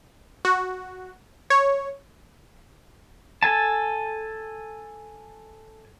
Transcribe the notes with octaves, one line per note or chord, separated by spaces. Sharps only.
F#4
C#5
A4 G#5 A5